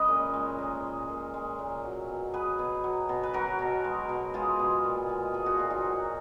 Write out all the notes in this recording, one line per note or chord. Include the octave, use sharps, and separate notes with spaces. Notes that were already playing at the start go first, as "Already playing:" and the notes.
Already playing: C#3 G#3 B4 C#5 D#5
A#2
G#3
A#2
G#3
A#2
G#3
A#2
F#3
B2
F#3 G#4 B4
B2
F#3
B2
B4
F#3 F#4 A#4
B2
G#3
B2
G#3 F4 G#4
B2
A#2
G#3
F3 G#4
F#4
A#2 F4
D#4 F#4
F#3